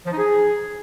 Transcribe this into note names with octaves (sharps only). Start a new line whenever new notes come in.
F3
D#4
G#4